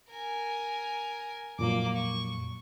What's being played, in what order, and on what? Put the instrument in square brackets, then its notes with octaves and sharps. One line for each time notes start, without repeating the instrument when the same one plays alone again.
[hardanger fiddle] A#4 G#5
[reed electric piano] F2 A#2 F#3 [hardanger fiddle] A#3 D6
[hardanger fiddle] C#6